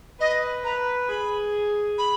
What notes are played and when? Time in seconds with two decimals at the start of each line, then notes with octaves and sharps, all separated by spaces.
0.20 B4 D#5
0.64 B4 A#5
1.09 G#4 B5
1.98 B5